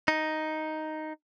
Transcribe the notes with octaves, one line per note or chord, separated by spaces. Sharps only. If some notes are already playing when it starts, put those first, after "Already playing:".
D#4